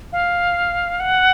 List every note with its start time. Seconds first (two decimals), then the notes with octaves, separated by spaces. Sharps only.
0.12 F5
1.00 F#5